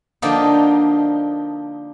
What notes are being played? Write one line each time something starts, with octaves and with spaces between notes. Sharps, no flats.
D3 F3 A#3 D4 D#4